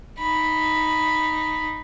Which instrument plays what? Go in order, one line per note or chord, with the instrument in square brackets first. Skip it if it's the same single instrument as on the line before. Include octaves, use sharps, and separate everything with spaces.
[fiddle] D#4 B5